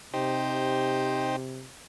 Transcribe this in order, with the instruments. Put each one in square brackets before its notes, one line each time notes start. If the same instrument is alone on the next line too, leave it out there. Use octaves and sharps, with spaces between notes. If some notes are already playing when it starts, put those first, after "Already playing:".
[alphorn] C3 [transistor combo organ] D#4 G4 C5